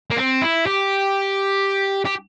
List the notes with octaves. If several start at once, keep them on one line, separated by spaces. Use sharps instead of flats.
A#3
C4
E4
G4
G4